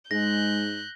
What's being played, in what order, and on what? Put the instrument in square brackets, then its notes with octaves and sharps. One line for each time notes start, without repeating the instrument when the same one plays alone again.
[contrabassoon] G#2 [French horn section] G#3 [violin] F#6 G6 [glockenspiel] A#6